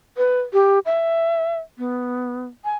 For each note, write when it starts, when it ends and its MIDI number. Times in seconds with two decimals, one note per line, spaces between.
0.17 0.40 71
0.53 0.79 67
0.86 1.57 76
1.78 2.45 59
2.65 2.76 80